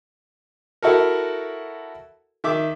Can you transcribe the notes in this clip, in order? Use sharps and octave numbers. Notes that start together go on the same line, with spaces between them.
E4 F#4 A4 A#4
D#3 E5 D6